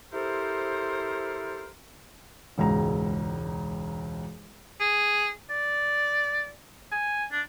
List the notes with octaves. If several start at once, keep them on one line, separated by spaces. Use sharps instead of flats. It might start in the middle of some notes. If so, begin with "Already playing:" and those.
E4 G4 A4 A#4 C5
E1 C#2 G#2 A#5
G#4
D5
G#5
D4